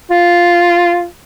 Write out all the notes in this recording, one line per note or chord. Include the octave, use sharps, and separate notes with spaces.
F4